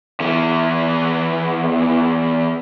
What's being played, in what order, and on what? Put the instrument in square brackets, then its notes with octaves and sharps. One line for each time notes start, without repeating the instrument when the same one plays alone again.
[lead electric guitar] E2 E3